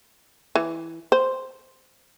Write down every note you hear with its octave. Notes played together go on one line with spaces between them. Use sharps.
E3
C5